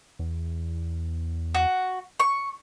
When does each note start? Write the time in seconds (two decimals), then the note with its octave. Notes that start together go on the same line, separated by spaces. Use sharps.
0.19 E2
1.55 F#4
2.20 C#6